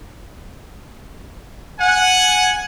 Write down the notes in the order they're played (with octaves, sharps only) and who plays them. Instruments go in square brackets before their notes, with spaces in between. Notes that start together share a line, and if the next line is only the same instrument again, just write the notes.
[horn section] F#5 G#5